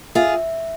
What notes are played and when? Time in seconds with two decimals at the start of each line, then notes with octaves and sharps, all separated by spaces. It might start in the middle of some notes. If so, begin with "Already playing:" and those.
0.15 F4 G#4 E5